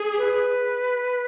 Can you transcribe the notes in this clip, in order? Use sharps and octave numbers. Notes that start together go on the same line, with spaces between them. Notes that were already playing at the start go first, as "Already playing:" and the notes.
Already playing: G#4
B4